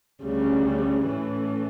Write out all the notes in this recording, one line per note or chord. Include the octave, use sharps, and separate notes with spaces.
D2 C#3 G3 C#4
A2 E3 A3 C#4